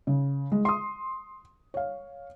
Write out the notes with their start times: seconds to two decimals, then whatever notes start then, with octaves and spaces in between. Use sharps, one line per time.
0.07 C#3
0.52 G#3
0.65 C6 D#6
1.74 C#5 F5